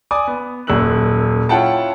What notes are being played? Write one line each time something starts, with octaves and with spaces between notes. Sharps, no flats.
D5 G#5 D6 D#6
B3
D#1 F#2 E6 F#6 F#7
C#4 E4 F4 F#5 G5 A5